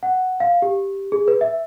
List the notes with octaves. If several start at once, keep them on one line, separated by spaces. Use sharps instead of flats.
F#5
F5
G4
G#4
B4
E5